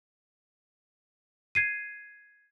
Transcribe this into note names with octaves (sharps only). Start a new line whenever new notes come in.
G#6 C7 D#7